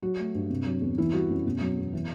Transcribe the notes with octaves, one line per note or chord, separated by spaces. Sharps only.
F#3 F#4
A3
G2
C3
F#3
E2
E3 E4
G3 F#4
F#2
B2
F#3
E2
E3